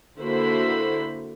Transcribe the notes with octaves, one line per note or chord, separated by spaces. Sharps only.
D3 A#3 E4 F#4 C5 B5